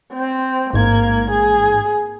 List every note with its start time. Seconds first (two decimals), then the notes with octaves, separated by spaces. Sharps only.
0.13 C4
0.73 A1 G#2 A#3 G#6
1.30 G#4